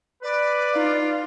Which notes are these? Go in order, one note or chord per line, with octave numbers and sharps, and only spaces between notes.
B4 D5
D#4 F4